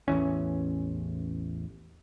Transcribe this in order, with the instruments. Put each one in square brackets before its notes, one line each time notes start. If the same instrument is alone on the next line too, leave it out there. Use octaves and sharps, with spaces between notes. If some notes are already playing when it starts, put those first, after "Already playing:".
[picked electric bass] A1 E2 E3 C#4